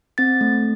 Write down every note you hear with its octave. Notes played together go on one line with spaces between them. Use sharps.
C4 A6
A3